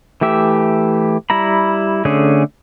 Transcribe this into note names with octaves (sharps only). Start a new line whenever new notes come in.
E3 A3 G4 E5
G3 E4 A#5 B5
D3 A3 C#4 G#4